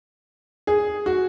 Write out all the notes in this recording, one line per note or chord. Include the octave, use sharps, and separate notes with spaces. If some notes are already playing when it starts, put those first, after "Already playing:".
G#4
F#4